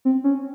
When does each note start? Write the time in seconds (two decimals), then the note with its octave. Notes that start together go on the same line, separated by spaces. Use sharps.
0.05 C4
0.24 C#4